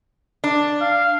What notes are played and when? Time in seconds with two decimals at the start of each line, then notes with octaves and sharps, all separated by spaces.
0.44 D4
0.81 F5